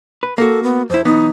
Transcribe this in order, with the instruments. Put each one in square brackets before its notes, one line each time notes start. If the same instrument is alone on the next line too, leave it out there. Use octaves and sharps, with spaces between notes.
[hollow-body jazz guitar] B4
[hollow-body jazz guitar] A#3 F#4 [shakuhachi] A4
[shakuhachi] B3
[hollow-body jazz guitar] F2 E4 [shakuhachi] C5
[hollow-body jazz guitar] B1 E3 B3 [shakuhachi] D#4